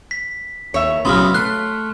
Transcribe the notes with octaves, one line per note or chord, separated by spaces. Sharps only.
B6
D#2 C#5 E5
A#1 A2 C#3 F#3 B3 C#4 C6 F6
A3 C6 F#6